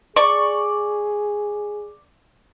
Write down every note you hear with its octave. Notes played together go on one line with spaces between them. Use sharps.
G#4 D5 C#6